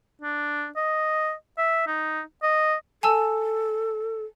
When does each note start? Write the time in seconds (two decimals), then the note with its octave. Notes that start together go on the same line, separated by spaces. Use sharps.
0.22 D4
0.76 D#5
1.58 E5
1.87 D#4
2.43 D#5
3.03 A4 G#5 A5 E6